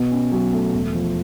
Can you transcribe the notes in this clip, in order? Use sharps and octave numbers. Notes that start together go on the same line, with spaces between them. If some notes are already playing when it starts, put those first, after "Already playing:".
Already playing: B2
C#4
F#3
A3
E1
F3